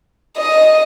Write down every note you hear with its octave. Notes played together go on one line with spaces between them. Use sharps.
D#5